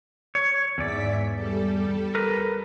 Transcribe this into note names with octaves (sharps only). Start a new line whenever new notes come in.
C#5
E2 G#2 D5 E5 B6
G3 A4
A#4 B4